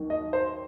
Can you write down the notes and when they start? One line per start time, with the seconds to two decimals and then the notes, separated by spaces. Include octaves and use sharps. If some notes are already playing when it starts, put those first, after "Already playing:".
Already playing: D#2 D#3 F#3
0.10 D#5
0.33 C5